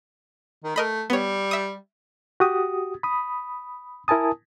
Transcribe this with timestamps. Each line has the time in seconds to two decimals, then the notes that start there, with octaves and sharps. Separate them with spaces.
0.64 D#3
0.76 A3 A#4 D#5 B5
1.10 G3 B3 C#5
1.51 E5 D#6
2.40 F#4 G4 D#6
3.03 B5 D#6
4.08 E4 A#4 G#5 A5 D#6